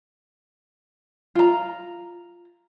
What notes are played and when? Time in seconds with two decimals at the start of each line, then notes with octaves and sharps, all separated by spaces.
1.35 F4 A#5